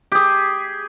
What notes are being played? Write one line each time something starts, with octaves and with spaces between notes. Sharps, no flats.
G4 G#4